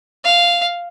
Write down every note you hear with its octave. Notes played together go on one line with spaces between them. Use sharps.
F5